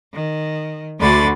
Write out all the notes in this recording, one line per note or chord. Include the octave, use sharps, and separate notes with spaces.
D#3
D2 D3 F#4 B5 C6 A6